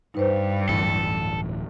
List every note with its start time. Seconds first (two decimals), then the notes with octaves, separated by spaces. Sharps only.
0.15 G2 D#4 B4 C5
0.69 D1 E3 A4